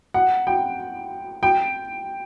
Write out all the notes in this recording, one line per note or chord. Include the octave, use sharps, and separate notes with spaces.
F#5
G5
G5